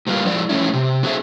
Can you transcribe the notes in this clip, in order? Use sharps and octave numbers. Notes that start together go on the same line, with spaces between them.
A2 G3 A#3 C#4 F4 B4
F3 G#3 E4 F#4 D5
F3 A3 C#4 E4
C3
B3 F#4 G#4 A4 C5 E5